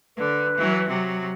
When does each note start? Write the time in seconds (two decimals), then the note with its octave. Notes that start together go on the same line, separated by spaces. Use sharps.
0.17 D3 B4
0.57 E3 F#3
0.88 C3 F#3